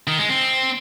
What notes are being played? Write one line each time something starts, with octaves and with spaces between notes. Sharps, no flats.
D#3
G#3
C4